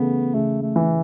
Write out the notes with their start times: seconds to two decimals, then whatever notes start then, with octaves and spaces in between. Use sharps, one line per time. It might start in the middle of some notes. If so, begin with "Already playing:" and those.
Already playing: C#3 E3 A3 B3
0.34 C#3 A3
0.62 A3
0.76 E3